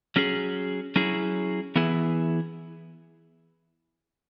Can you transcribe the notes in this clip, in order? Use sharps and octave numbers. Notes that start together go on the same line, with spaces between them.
F#3 C#4 G#4
F#3 C#4 E4 G#4
E3 B3 E4 G#4